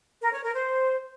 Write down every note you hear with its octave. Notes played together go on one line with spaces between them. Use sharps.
A#4
C#5
A#4
C5